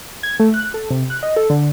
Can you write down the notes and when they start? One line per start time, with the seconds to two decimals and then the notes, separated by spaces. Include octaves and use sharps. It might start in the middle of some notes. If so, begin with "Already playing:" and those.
0.23 G#6
0.40 A3
0.54 F#6
0.74 A4
0.91 C3
1.10 F#6
1.23 D#5
1.36 A4
1.50 D3